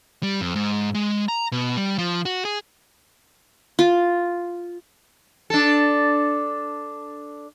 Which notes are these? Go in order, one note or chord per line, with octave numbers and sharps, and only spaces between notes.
G3
F2
G#2
G#3
A#5
B2
G3
F3
F#4
G#4
F4
D4 A4